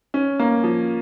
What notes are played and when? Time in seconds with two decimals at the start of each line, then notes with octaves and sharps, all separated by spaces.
0.14 C#4
0.39 A#3
0.63 F3